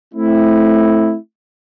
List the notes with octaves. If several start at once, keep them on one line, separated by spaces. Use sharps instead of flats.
A3 C4 E4